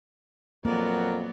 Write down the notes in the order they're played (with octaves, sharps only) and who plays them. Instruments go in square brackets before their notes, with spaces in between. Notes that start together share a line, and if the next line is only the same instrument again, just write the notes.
[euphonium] F2 [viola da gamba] F#3 B3 D5 [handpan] A#3 [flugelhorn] A#4